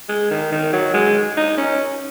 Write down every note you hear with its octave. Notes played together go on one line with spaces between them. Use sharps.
G#3
D#3
D#3
F#3
G#3
D#4
C#4